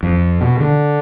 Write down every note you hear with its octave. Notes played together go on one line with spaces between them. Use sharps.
F2
B2
D3